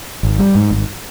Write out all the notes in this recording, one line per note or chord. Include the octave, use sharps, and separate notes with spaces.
G#1
G3
G#2
G#1